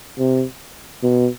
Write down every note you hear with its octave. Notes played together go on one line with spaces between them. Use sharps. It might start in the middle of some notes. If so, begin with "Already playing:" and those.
C3
B2